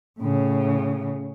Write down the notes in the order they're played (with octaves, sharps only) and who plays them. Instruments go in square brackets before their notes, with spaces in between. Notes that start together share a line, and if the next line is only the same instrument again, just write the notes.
[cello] A2 C#3